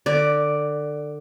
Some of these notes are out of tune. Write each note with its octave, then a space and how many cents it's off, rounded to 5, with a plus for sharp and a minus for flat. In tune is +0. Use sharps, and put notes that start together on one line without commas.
D3 +25 D5 +0